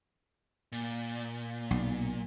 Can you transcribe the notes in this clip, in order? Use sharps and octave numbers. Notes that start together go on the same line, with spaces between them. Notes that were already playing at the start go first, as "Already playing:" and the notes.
A#2
B1